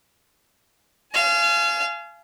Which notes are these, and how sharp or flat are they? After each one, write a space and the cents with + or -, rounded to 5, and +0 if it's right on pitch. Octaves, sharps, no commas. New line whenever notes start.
F5 -30 G#5 +30